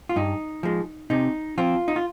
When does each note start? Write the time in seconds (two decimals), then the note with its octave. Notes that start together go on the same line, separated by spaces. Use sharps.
0.09 F4
0.16 G2 D#4
0.63 F3 G#3
1.10 C3 D#4
1.58 F3 C4 F4
1.88 D#4
1.96 F4